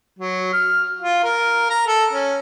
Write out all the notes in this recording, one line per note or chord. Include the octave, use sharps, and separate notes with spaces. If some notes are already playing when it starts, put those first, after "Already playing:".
F#3
F6
F4
A#4
A#5
A4
C#4